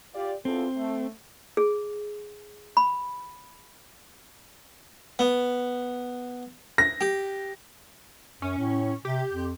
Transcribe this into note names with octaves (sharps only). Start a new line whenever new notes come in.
F4 G4 D5
E2 C4 F4 A4
A3
G#4
B5
B3
A#6
G4
F#2 C#4
A2
C3 G4
F2